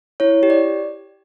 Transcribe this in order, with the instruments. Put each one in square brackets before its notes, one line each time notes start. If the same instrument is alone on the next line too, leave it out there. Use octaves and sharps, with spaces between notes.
[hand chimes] E4 C#5
G4
D5